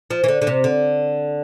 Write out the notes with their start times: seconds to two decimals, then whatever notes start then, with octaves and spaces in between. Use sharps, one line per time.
0.11 F3
0.24 E3
0.28 D3
0.42 D3
0.47 C3
0.64 D3